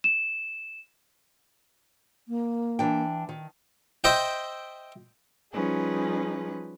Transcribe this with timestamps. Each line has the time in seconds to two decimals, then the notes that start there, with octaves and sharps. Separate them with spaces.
0.04 E7
2.28 A#3
2.79 E3 D4 G5
3.29 D#3
4.04 C5 D#5 E5 G5
5.51 F3 G3 C#4 D#4 G#4 B4